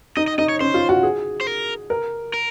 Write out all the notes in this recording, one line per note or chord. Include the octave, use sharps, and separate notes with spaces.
D#4 D#5
D#5
D#4 D#5
C#5
C#4 C5
F4
F#4
G#4
C5
A#4
A#4
A#4